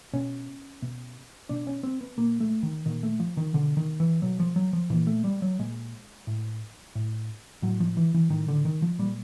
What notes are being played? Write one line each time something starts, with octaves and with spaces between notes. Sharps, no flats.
B2 C#4
B2
B2 D4
C#4
C4
B3
A#2 A#3
A3
D#3
A#2 D#3
A3
F3
D#3
B2 D3
D#3
E3
B2 F#3
F3
F#3
F3
A#2 E3
A3
G3
F#3
A#2 G#3
A2
A2
A2 F#3
F3
E3
E3
A2 D#3
D3
D#3
F3
A#2 G3